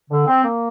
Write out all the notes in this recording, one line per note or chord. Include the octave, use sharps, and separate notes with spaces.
D3
C4
A#3